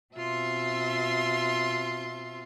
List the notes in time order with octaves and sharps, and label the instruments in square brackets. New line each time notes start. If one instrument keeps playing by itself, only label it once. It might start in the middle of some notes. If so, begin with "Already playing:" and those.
[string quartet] B2 C4 F4 E5 C6